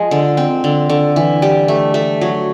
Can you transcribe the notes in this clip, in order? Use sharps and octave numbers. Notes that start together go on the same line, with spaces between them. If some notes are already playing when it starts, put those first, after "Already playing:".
Already playing: F3 G#3
D3
C4
D3
D3
E3
G3
A3
A3
F#3